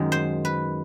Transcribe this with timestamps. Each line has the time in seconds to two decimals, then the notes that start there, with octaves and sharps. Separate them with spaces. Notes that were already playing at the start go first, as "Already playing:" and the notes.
Already playing: F#2 D#3 G#3
0.12 C5
0.45 B4